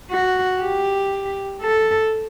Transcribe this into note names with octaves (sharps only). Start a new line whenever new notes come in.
F#4
G4
A4